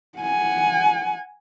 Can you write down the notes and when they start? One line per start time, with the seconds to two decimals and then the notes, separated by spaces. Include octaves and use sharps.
0.19 F#5 G#5